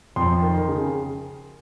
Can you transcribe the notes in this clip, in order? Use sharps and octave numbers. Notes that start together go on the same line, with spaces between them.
F2 C6
D#3
C#3